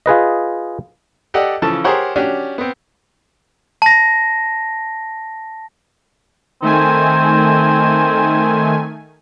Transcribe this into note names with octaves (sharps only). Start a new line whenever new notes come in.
F4 G#4 B4 D#5
G4 A4 D5 D#5 F#5
C#3 E3 F3 A4 A5
G4 G#4 A#4 C5 C#5 F#5
C#4 D4 F#4 G4
B3 C4
A5 A#6
D#3 A3 C4 G#5